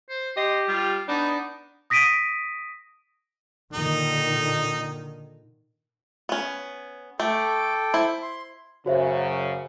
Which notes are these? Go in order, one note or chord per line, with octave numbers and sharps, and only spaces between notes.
C5
G4 D#5 C6
G3 F4
B3 D4 D#4
D#6 A#6 B6 D7 D#7
A#2 D3 D#3 D#4
B3 C#4
A3 A4 G5 D6
E4 C5
C6
F#2 C#3 F#4 C5 E5